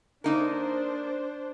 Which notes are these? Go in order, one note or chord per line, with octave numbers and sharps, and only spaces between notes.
A#3 D4 D#4 A#4 C5